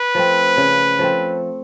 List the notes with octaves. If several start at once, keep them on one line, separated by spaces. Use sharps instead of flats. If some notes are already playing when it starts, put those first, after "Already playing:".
Already playing: B4
F3 A3 C4
C#3
F3 A3 C4